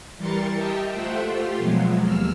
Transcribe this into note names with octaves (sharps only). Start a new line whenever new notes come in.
E3 G3 A#4 C6 A6 C#7
G4 A#4 D#5 E5 G5 A5
A3 F4 C5 E5 F#5 G5
A3 F4 G4 C6
B2 F3 F#3 G#3
D#2 E6 F6